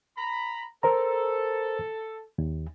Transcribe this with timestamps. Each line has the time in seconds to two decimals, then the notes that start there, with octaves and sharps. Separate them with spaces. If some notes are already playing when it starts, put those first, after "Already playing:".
0.17 A#5 B5
0.83 A4 A#4 C5 A#5
2.38 D#2